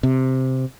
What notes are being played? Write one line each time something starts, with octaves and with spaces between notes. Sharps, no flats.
C3